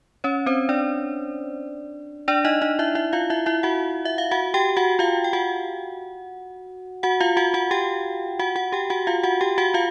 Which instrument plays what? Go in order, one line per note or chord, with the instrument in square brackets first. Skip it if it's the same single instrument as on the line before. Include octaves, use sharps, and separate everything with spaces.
[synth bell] C#4 C#5
C4 C5
D4 D5
D4 D5
D#4 D#5
D#4 D#5
E4 E5
E4 E5
F4 F5
E4 E5
E4 E5
F#4 F#5
E5
F5
F#4 F#5
G4 G5
F#4 F#5
F4 F5
G5
F#4 F#5
F#4 F#5
F4 F5
F#4 F#5
F#4 F#5
G4 G5
F#4 F#5
F#4 F#5
G4 G5
F#4 F#5
F4 F5
F#4 F#5
G4 G5
F#4 F#5
F4 F5